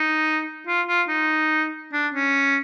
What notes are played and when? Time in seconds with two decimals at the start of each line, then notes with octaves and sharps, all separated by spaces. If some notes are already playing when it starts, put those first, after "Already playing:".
Already playing: D#4
0.67 F4
0.88 F4
1.08 D#4
1.93 D4
2.14 C#4